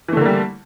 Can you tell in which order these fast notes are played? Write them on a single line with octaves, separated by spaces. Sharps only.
E3 A3 D3 A#3 G3